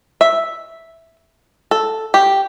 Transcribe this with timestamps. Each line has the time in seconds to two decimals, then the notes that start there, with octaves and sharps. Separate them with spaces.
0.21 E5
1.71 A4
2.14 G4